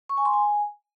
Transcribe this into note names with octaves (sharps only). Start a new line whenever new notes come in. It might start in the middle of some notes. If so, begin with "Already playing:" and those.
C#6
G#5
C6
G#5